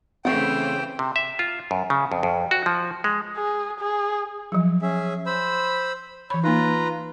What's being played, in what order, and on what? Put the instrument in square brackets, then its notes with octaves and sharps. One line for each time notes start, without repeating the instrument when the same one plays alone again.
[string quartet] C#3 E3 C5 [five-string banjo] A3 F#5 [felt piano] C4 [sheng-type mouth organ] G5
[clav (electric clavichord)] C3
E5
F4
F#2
C#3
F2
F2
F#4
F3
G#3
[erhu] G#4
G#4
[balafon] F3 F#3
[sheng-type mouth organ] C#4 G#4 E5
C5 B5 E6
[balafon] E3 B5 [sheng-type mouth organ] C#5
[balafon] A#3 D#4 [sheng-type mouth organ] F4 B4 A#5